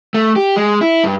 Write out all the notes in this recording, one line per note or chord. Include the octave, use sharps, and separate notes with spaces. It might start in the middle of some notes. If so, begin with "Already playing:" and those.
A3
G4
G#3
E4
G2